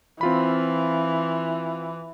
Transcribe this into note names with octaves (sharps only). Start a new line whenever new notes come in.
E3 C4 F4 B5